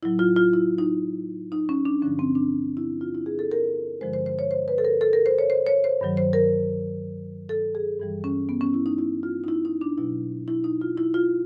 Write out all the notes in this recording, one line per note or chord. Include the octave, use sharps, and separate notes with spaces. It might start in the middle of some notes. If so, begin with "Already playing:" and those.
A2 F#3 E4
F4
F4
E4
D#4
D#4
C#4
D4
G2 D3 F3 C#4
C4
D4
E4
F4
E4
G#4
A4
A#4
G2 D3 F3 G#3 C5
C5
C5
C#5
C5
B4
A4
A#4
A4
A#4
C5
C#5
C5
C#5
C5
G2 D#3 F#3
C5
A#4
A4
G#4
G2 E3 G3
C#4
B3
C#4
E4
D#4
E4
F4
D#4
E4
D#4
D4
B2 F#3 E4
E4
D#4
F4
E4
F4